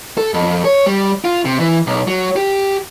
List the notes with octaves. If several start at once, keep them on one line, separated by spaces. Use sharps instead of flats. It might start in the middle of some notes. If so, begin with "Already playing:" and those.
A4
F2
C#5
G3
F4
C3
E3
B1
F#3
G4